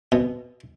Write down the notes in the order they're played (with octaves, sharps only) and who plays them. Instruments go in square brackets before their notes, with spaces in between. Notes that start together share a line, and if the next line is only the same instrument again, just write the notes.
[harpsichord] B2